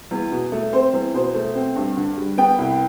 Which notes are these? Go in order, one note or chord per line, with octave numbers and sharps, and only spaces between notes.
E2
B2
A3
C4 C5
E2
B2 C5
A3
C4
G2
D3
G3
B3 G5
C2